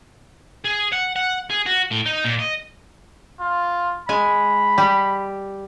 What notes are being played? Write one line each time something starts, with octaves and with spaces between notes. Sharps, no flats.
G#4
F#5
F#5
G#4
F#4
A2
D#4
A#2
D#5
F4
G#3 G#5 B5
G3 G4